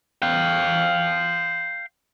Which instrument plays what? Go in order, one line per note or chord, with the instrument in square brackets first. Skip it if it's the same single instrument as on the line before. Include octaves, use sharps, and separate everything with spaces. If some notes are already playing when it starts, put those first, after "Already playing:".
[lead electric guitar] F5 G5